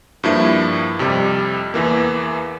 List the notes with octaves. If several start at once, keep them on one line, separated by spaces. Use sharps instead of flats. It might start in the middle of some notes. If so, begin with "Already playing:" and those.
G2 F3 A#3 E4
F2 C3 G3
E2 E3 A#3